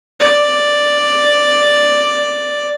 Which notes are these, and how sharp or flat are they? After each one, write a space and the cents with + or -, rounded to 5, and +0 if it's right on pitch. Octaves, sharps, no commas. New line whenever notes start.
D5 +0